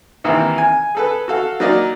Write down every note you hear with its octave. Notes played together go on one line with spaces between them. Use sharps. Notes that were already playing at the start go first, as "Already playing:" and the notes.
C3 D#3 E3 A#3
G#5
G#4 A4 B4
F#4 A4 F5
F#3 A#3 D#4 D5 D#5